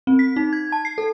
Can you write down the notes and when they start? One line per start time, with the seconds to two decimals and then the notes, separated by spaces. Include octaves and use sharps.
0.07 C4
0.19 B6
0.36 D#4
0.53 G#6
0.72 A5
0.85 C7
0.98 A4